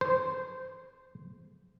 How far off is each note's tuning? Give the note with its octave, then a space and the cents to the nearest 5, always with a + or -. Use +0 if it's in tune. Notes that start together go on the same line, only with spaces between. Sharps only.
C5 -15